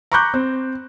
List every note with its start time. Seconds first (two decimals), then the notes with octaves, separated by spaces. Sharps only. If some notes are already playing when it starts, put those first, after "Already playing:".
0.12 A#5 B5 C#6 D6 F#6 G6
0.34 C4